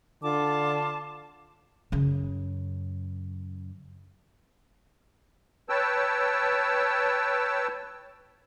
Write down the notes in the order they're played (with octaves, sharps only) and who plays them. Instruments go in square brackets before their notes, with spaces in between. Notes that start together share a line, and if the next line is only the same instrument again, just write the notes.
[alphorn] D3 [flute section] F4 A5 D6
[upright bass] F#2 C#3
[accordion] B4 C#5 G5 A5 E6